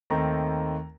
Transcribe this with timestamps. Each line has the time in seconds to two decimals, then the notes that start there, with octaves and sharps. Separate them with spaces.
0.10 D#2 D#3 A3 C4 D#4 A#5